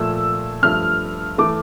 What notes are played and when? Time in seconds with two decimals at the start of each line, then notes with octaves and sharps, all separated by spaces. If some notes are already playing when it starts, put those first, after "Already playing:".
Already playing: A#2 F3 A3 E6
0.62 G2 F3 A3 F6
1.38 E3 A3 D6